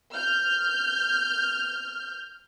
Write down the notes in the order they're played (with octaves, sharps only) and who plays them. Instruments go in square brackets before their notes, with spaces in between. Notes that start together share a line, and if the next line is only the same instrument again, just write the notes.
[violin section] F6 G6